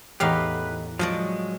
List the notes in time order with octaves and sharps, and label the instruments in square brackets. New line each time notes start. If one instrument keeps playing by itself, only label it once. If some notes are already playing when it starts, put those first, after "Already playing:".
[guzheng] E2 A2 F5 [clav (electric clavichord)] D#4 G4 [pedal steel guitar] B4
[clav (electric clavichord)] F3 [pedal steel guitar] F#3 G#3 C#6 [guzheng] D5 D#5 A5